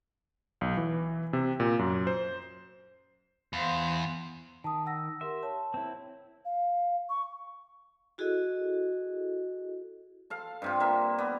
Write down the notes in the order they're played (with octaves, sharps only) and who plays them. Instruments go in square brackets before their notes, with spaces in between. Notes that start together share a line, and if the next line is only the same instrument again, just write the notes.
[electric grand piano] B1
E3
C3
A#2
F#2
C5
[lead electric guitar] E2 [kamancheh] C5 F5
[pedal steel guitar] D#3 [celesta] A5 D#6
[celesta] F#5 E6 A#6
[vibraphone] G4 A#4 C6 [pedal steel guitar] E5
[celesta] C#5 [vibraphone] A5
[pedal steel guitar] C4 E4
[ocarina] F5
C#6
[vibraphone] E4 F#4 G#4 A4 D#5
[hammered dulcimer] A4 F5
G2 C3 F4
A#3 E5
B3 D5